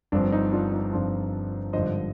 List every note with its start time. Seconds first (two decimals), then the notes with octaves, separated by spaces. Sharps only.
0.12 G1 G2 F3 C4 D4
0.32 D#4
0.53 D4 F4
0.73 D#4
0.92 G1 G2 F3 C4 D4 F4
1.73 G#1 G2 D3 F3 C5 D#5